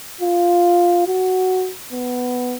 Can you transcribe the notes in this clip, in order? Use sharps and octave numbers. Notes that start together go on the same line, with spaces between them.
F4
F#4
B3